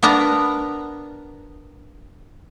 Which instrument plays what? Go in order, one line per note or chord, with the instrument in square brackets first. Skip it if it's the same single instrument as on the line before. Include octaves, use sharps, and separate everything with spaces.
[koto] B3 D4 A#4 A#5